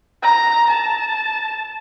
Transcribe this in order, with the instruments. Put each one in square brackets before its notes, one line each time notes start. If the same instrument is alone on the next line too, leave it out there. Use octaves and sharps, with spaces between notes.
[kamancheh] A#5
A5